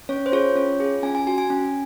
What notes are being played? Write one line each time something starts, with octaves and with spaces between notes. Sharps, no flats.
C#4 C#5
C5
F4 G#4 C#5
C#4 C#5
F4 G#4
C#4 G#5
G#5
F#4 G#5
G#5
C#4 G#5